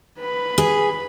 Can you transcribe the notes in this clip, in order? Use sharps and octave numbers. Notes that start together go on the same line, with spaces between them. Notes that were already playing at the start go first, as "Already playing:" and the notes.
B4 B5
G#4